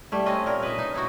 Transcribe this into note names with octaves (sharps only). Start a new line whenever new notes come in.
G3 A3 E4
C4 C#4 D#5
A#2 A#4
B4 D#5 E5
D#4
D#4 E4 F#4